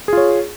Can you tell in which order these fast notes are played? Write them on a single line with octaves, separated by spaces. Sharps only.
G#4 F4 C#5